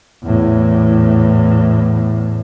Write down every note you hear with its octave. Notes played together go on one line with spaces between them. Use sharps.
E2 A2